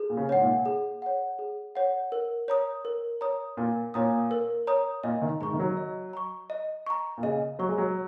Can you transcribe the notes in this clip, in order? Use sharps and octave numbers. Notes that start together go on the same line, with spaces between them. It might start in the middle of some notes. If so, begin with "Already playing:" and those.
Already playing: G#4
A#2
C#3
G#2 C#5 F#5
A#2
G#4
C#5 F#5
G#4
C#5 F#5
A#4
C#5 A#5 D#6
A#4
C#5 A#5 D#6
A#2 A#4
A#2 C#5 A#5 D#6
A#4
C#5 A#5 D#6
A#2 D#5
D#3
G#2 A#5 C#6
D#3
F#3
D#5
A#5 C#6
D#5
A#5 C#6
A#2
C#3 D#5
F#3 A#5 C#6
G#3
F#3